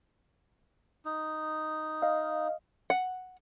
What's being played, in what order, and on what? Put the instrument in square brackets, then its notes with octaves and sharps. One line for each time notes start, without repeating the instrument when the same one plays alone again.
[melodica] D#4
[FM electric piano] D#5 F5
[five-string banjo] F#5